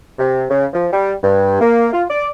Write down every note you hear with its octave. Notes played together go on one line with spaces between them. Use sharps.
C3
C#3
F3
G3
G2
A#3
F4
D5